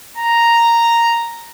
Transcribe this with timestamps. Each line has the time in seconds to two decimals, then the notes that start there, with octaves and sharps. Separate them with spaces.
0.17 A#5